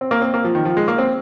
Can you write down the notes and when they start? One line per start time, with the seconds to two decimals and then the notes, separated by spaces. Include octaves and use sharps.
0.01 C4
0.11 A#3
0.22 C4
0.34 A#3
0.44 F3
0.55 D#3
0.65 F3
0.77 G#3
0.88 A#3
0.98 C4